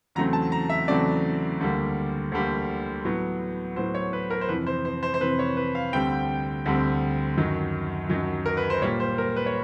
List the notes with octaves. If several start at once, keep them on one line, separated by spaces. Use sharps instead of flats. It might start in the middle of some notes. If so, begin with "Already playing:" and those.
E2 C#3 F#3 A3 C4 A#5
A5
A#5
E5
E2 C#3 F#3 A3 C4 D5
D2 D3 G3 A#3
D2 D3 G3 A#3
A2 F#3 B3
A2 F#3 B3 C5
C#5
B4
A#4
C5
F2 C3 E3 B4
C5
C5
C5
C5
F2 C3 E3 B4
C#5
B4
F5
D2 D3 G3 C4 G5
D2 D3 G3 C4
F#2 D#3 F#3
F#2 D#3 F#3
A#4
B4
C5
A#2 G3 A#3 C#5
C5
A#4
B4
C#5